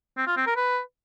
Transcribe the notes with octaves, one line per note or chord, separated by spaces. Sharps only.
C4
F4
C4
A#4
B4